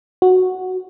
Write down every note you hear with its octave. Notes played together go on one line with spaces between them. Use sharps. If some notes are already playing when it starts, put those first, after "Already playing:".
F#4